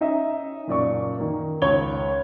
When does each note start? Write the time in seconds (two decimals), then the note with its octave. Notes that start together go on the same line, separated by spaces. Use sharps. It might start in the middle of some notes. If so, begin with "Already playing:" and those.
0.01 C#4 D#4 D#5 E5
0.68 F#1 A#2 D5 C#6
1.18 D#3 A#3
1.62 C#2 C#5 G#6 G7